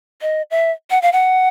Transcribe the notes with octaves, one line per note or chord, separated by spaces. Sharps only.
D#5
E5
F#5
F5
F#5